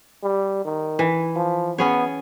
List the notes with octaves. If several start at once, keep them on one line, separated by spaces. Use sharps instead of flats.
G3
D#3
E3
F3
B3 C#4 G#4 C#5